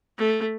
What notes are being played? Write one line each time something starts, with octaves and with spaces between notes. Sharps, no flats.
A3